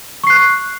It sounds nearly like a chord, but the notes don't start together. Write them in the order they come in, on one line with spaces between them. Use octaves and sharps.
C#6 C7 F#6